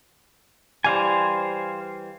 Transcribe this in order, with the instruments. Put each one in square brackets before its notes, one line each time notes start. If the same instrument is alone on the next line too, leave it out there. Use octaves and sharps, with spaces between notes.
[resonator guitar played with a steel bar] E3 G3 [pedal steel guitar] C5 F5 G#5